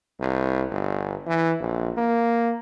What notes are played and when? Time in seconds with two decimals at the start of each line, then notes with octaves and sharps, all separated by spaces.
0.20 C2
0.71 G1
1.27 E3
1.60 A#1
1.97 A#3